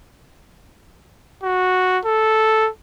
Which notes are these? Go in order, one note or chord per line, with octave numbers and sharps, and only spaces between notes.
F#4
A4